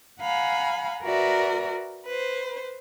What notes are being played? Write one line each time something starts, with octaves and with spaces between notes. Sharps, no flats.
F5 F#5 G#5 A#5 B5
F#4 A#4 B4 D5 E5
B4 C5